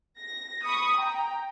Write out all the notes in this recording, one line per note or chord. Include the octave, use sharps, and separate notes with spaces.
A#6
B5 C#6 D#6
G5 A#5